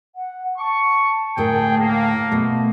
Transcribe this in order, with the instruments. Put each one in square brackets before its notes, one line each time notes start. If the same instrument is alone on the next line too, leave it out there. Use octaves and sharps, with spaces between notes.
[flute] F#5
[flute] A5 [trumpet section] C#6
[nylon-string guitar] D2 A2 A#4 [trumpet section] G#4 G5
[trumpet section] A#3
[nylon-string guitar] B2 A3